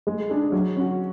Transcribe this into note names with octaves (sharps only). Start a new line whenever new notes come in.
G#3
D4 G#4
F#3
C#4 F#4